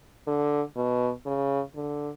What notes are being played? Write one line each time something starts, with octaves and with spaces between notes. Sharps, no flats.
D3
B2
C#3
D3